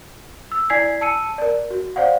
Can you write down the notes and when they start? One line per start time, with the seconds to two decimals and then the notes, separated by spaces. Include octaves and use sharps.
0.52 E6
0.70 E4 D5 G#5 G#6 B6 C7
1.01 A5 E6 C#7 D#7
1.38 A#4 D5
1.70 F#4
1.96 C5 D5 F5 F#5